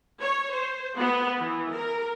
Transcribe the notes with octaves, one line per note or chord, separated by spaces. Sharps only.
C#5
C5
B3
E3
A#4